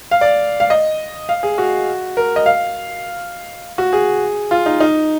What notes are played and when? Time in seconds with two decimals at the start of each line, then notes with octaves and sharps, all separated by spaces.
0.11 F5
0.21 D5
0.60 F5
0.70 D#5
1.29 F5
1.43 G#4
1.58 F#4
2.17 A#4
2.36 D#5
2.46 F5
3.78 F#4
3.93 G#4
4.51 F4
4.66 D#4
4.80 D#4